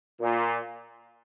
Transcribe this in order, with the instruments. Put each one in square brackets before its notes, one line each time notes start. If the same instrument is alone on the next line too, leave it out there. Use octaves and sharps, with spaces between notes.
[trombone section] A#2